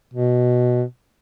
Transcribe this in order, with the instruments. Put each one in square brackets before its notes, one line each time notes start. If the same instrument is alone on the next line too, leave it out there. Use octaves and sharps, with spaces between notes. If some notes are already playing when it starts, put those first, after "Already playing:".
[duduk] B2